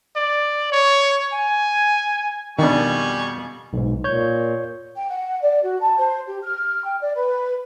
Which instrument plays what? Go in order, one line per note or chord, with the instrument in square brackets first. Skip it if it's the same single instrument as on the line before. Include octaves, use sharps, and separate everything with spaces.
[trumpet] D5
C#5
G#5
[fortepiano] F2 B2 [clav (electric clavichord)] D#3 D4 [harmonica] G3 G#5 C#6
[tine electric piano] B1 G#2
[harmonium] A#2 [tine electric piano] C#5 G6
[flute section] G5
F#5
D5
F#4
A5
C5
G4
F6
G5
D5
B4